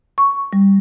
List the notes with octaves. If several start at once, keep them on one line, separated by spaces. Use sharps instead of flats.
C#6
G3